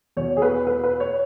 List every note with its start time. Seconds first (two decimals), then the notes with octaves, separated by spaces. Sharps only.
0.17 E2 B2 C#5
0.37 G#4
0.42 B4
0.67 B4
0.83 B4
1.00 C#5